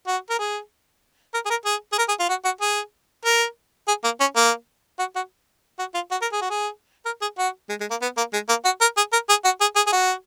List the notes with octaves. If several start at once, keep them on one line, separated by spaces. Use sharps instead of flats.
F#4
A#4
G#4
A#4
G#4
A#4
G#4
G#4
A#4
G#4
F4
F#4
F#4
G#4
A#4
G#4
A#3
C#4
A#3
F#4
F#4
F#4
F4
F#4
A#4
G#4
F#4
G#4
A#4
G#4
F#4
G#3
G#3
A#3
B3
A#3
G#3
A#3
F#4
A#4
G#4
A#4
G#4
F#4
G#4
G#4
G#4
F#4